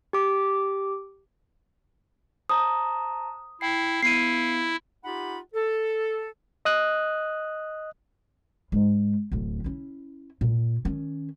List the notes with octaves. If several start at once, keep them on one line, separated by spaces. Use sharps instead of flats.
G4 D6
C5 A5 A#5 D#6
E4 G5 C7
B3 E4 C7 D#7
D#4 F4 G4 F#5 B5
A4
D#5 D#6 F#6
G#2 G#3
D1 D3
C#4 E4
A#2
D#3 C#4